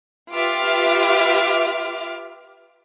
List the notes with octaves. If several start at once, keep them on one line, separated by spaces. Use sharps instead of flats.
F4 G4 B4 E5 D6 F6